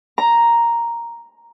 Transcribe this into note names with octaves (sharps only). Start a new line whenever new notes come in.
A#5